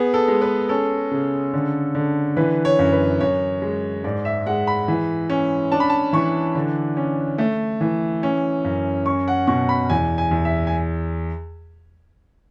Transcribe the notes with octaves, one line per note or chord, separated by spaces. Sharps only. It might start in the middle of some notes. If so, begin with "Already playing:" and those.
Already playing: B3 G#4
A4
G#3
B4
C#4 A4
C#3
D3
D3
E3 B4
C#5
F#2
B4
F#2 C#5
G#3
G#2 D5
E5
G#3 F#5
B5
E3
C#4
D4 A5
B5
A5
E3 C#6
D3
C#4
A3
E3
C#4
F#2
C#4 C#6
F#5
B2 C#6
B5
E2 G#5
G#5
E2
E5
G#5